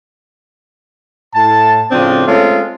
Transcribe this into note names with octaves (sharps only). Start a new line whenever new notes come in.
A2 A5
A2 C#3 F3 C4 D4 F4
G#3 A3 C4 C#4 F4 A4